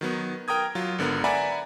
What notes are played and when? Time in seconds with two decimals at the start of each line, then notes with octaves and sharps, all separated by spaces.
0.01 D#3 F#3 B3
0.48 A#4 G5 A#5 D#6 G#6
0.75 F#3 F4
0.98 G#1 D3 B3 A#4
1.24 D5 E5 F#5 G#5 A#5 B5